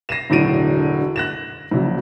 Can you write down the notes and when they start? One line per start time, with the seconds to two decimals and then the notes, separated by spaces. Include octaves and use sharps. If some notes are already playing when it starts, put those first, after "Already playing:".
0.09 A#6 C7 D#7 E7
0.30 E1 A2 D3 F#3 D7 D#7
1.16 F#6 A#6 E7
1.71 A#1 C#3 F#3